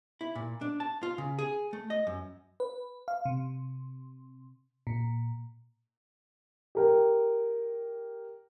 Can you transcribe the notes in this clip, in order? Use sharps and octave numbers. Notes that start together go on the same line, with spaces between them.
E4
A#2
D4
A5
F4
C#3
G#4
A3
D#5
F#2
B4
F5
C3
A#2
G4 A#4 G5